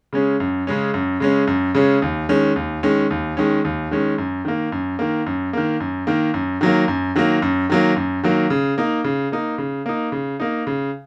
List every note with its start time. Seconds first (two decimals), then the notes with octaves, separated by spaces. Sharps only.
0.13 C#3 G#3 C#4
0.40 F#2
0.67 C#3 G#3 C#4
0.94 F#2
1.20 C#3 G#3 C#4
1.47 F#2
1.75 C#3 G#3 C#4
2.02 D#2
2.29 D#3 G#3 C#4
2.56 D#2
2.83 D#3 G#3 C#4
3.11 D#2
3.37 D#3 G#3 C#4
3.65 D#2
3.91 D#3 G#3 C#4
4.18 F#2
4.45 D#3 A#3
4.72 F#2
4.99 D#3 A#3
5.26 F#2
5.53 D#3 A#3
5.80 F#2
6.07 D#3 A#3
6.34 F#2
6.61 D#3 F#3 A#3
6.88 F#2
7.16 D#3 F#3 A#3
7.42 F#2
7.70 D#3 F#3 A#3
7.96 F#2
8.24 D#3 F#3 A#3
8.50 C#3
8.78 A#3 D#4
9.04 C#3
9.32 A#3 D#4
9.58 C#3
9.86 A#3 D#4
10.12 C#3
10.40 A#3 D#4
10.67 C#3